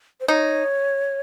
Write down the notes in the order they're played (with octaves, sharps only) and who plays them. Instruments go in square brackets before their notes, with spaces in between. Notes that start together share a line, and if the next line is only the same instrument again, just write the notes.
[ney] C5
[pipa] D#4 [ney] C#5